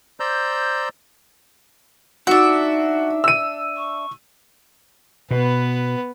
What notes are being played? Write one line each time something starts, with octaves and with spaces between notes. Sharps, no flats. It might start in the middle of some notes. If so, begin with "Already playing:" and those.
C5 D5 A#5 E6 G6
D4 D#4 F#4 E5
E6 D#7
C#6
B2 B3 B4